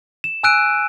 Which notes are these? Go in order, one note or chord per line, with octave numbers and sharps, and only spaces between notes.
E7
G#5 E6 F#6 D7 D#7